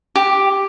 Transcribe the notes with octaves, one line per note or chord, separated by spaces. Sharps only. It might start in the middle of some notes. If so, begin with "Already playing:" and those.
G4